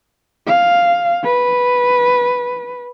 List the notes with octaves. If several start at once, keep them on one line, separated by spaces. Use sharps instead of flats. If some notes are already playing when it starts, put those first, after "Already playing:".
F5
B4